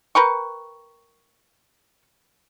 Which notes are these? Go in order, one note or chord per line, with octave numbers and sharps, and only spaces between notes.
A#4 B4 G5 C#6